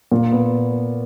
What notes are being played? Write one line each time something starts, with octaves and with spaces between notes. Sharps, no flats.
A#2
B3